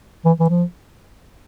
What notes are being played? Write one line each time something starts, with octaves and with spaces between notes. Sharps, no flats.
E3
E3
F3